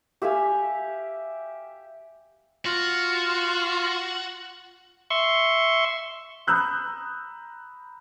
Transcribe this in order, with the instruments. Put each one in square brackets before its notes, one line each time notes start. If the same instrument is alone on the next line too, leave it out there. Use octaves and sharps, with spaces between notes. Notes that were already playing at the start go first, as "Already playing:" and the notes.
[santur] G4 E5 F5 G#5
[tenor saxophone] F4 [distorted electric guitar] F#4
[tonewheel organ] E5 C6 C#6
[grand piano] A#5 B5 D#6 E6 F#6 G6